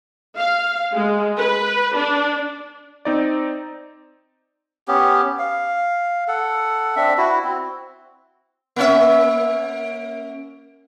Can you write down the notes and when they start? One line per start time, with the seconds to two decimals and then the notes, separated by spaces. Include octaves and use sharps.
0.37 F5
0.93 G#3
1.37 B4
1.94 D4
3.05 C4 D#4 D5
4.88 B3 C#4 G4
5.39 F5
6.28 A4 F#5
6.96 C4 D4 E5
7.18 E4 F#4
7.44 C4
8.76 A#3 C#4 E5